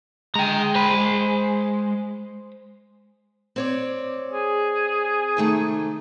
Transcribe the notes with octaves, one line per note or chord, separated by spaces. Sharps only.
G#3 G5 A#5
C5 B5
C4 C#5 D5
G#4
C3 D#3 A3